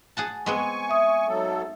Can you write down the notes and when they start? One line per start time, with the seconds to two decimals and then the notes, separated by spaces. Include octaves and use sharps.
0.17 G#4 F#5 A5
0.46 G#3 B3 C4 G#5 C#6
0.89 E5 D#6
1.28 G#2 F#3 A4